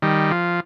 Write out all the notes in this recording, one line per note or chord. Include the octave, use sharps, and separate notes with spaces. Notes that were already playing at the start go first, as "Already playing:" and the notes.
D#3 G3
F3